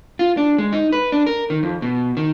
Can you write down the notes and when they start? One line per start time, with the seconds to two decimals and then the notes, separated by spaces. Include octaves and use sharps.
0.19 F4
0.37 D4
0.58 G#3
0.73 D#4
0.92 B4
1.12 D4
1.27 A#4
1.50 D#3
1.63 F2
1.82 B2
2.17 D#3